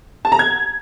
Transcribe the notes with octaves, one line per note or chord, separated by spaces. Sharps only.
A5
A#5
G#6